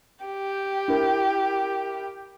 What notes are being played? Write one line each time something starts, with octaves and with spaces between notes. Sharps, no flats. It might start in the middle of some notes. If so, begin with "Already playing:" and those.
G4
E4 A#4